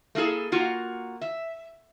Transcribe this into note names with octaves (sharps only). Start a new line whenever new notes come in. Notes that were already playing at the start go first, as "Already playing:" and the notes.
A3 A#3 E4 G#4 A4
A#3 F4 F#4
E5